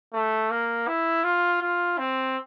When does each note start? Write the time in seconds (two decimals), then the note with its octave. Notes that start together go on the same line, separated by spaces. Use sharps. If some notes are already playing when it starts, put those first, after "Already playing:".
0.13 A3
0.51 A#3
0.88 E4
1.24 F4
1.62 F4
1.98 C4